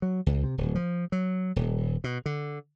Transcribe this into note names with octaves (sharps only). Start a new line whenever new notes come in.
F#3
C#2
C3
D1
F3
F#3
D#1
B2
D3